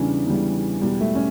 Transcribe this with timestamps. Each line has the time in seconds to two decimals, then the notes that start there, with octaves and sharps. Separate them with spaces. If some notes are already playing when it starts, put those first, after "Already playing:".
Already playing: E2 C#3 E3 G3 C#4 D4
0.25 E2 C#3 E3 G3
0.82 E2 B2 G3
1.01 A3
1.15 C#4